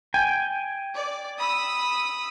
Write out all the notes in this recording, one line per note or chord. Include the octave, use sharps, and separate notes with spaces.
G5 G#5
D5
B5 D#6 E6